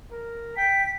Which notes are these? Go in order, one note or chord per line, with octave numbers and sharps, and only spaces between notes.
A#4
G5 B6